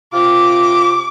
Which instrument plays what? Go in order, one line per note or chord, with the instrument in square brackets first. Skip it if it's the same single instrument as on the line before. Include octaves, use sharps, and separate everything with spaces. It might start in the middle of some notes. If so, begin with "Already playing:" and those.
[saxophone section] C3 F4 [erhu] D6